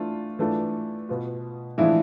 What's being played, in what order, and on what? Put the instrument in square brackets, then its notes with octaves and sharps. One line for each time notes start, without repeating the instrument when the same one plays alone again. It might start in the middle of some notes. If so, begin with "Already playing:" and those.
Already playing: [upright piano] E3 A3 D4 F4
E3 A3 D4 F4
B2 B3 F4
[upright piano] A2 F3 G#3 D4 [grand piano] E3 E4